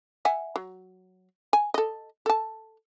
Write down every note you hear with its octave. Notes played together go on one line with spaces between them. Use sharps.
E5 F#5 G#5
F#3
G#5
A4 D#5
A4 A5